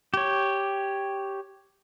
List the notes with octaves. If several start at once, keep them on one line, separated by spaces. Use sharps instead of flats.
G4 C#5